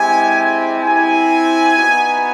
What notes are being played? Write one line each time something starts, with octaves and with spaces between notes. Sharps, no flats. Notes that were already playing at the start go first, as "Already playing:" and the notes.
Already playing: G#3 C4 E4 G4 G#5
G#5
C4 E4 G4 G#5
B3 D#4 F#4